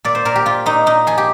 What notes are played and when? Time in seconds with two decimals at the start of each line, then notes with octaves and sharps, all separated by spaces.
0.05 A#2 D5
0.15 C5
0.25 A#2 A#4
0.36 G4
0.46 A#2 F4
0.66 A#2 D#4
0.86 A#2 D#4
1.07 F3 G#4
1.18 G4